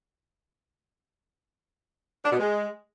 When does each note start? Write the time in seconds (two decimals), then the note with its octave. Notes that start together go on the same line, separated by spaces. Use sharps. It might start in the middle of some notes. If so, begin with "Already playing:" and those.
2.24 D4
2.31 B2
2.39 G#3